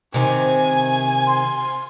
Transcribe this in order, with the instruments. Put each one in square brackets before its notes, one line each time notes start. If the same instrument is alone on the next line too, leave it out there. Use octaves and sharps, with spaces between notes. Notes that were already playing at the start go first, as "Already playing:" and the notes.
[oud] C3 D#3 [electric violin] G#5
[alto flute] C6